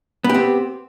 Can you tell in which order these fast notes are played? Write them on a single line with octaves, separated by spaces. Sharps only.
B3 G4 C4